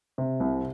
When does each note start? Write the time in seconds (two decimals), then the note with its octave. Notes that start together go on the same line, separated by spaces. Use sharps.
0.18 C3
0.40 C2